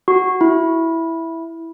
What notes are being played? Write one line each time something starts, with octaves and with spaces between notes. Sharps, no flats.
F#4
E4